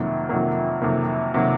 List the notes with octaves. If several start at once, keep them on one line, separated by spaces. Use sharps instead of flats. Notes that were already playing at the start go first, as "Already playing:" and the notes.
Already playing: F2 C3 D#3 F#3 A#3
F2 C3 D#3 F#3 A#3
F2 C3 D#3 F#3 A#3
C3 D#3 F#3 A#3